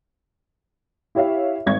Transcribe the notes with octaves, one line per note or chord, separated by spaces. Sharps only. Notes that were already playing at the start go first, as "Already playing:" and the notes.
E4 G4 C#5 E5 F5
G#1 C#6 G#6